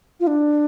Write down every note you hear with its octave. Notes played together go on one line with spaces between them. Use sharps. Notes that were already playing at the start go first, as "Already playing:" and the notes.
F4
D4